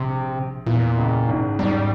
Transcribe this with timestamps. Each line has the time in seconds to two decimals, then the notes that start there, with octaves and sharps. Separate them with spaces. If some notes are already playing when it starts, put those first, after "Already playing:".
Already playing: A#1 C3
0.66 E2 A#2 E3
0.98 C#2 C#3
1.28 G#1 G#2
1.59 G#1 G#2 G3